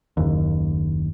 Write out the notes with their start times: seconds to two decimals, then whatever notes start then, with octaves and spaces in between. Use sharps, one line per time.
0.17 F#1 D#2